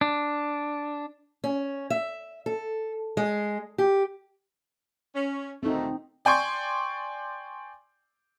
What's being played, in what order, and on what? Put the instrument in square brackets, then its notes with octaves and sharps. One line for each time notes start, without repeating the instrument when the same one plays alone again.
[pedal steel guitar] D4
[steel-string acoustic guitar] C#4
E5
A4
G#3
G4
[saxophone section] C#4
[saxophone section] D2 A#2 A3 [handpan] C4 D#4
[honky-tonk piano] D5 G5 G#5 C6 C#6